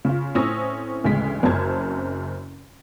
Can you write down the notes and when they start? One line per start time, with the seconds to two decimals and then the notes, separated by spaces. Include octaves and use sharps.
0.05 C#3 F4
0.35 A2 C4 C#4 D#6 E6 A#6
1.04 A1 D2 C#3 G#3 B6
1.43 F#1 F#2 C#3 C4 A5 G#6